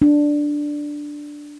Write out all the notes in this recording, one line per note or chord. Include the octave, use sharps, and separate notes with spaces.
D4